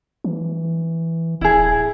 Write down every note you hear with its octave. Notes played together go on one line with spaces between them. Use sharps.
E3
D1 E4 G#4